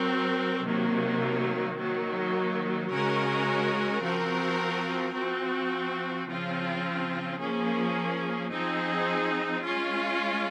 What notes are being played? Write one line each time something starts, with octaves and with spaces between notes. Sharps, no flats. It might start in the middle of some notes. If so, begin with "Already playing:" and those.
Already playing: F#3 C4 F#4 A#4
C3 D#3 F#3 A#3
D#3 F#3 A#3
C#3 G#3 C#4 F#4 A#4
F3 C4 F#4 A#4
F3 C4 F#4
C#3 F3 C4 F4
F3 A#3 C#4 G#4
F3 C4 D#4 G#4
G#3 C#4 F4